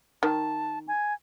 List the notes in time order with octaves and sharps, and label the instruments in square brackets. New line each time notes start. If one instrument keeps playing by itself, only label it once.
[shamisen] D#3 [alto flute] A5
[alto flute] G#5